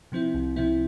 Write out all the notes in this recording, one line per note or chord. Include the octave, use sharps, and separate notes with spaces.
C3 F3 C4 E4
C2
C3 F3 C4 E4